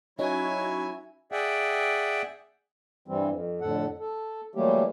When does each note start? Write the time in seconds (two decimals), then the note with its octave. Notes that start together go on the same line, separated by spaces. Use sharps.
0.19 F#3 C#4 D#4 E4 F#4 C#5 E5 G#5
1.32 G#4 D5 E5 F#5 G5
3.08 G2 E3 G3 C4
3.31 F2
3.61 F2 A2 D3 A4 F#5
3.99 A4
4.55 E3 F#3 G3 A3 A#3 G4